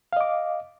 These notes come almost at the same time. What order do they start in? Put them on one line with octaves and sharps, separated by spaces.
F5 D#5 D6